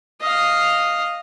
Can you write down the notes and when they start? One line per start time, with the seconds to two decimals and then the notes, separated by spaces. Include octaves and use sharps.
0.21 D#5 F5